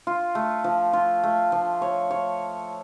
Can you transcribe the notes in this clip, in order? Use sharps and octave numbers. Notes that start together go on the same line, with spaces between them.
F4
A3
F3
F4
A3
F3
C#5
C#5